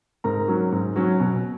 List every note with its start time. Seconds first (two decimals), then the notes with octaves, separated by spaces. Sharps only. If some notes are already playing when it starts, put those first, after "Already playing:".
0.24 G#2 A#4 A#5
0.48 F#3 C#4
0.72 G#2
0.96 F#3 C#4
1.20 B2